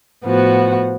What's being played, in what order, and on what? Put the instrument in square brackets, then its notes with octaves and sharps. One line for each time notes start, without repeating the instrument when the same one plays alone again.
[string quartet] A2 F3 B3 F#4